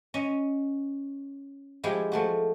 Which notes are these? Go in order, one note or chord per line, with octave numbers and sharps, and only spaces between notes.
C#4 D#5
F3 G#3 E4 G4
F3 A3 F#4